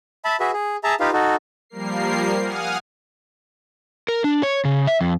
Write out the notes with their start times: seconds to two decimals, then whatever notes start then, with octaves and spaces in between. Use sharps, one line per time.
0.25 E5 A5 B5
0.40 F#4 G#4 B4 E5
0.53 G#4
0.84 G#4 E5 A5 A#5
1.00 D#4 F4 G4 B4 F5
1.13 D#4 F#4 A4
1.70 F3 G3 A#3 A#4 C7
2.41 F5 F#5 G#5 D#6 F6
4.08 A#4
4.24 D4
4.43 C#5
4.65 C#3
4.87 E5
5.01 F2